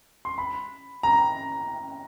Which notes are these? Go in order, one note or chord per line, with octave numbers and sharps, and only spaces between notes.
C6
B5
A#5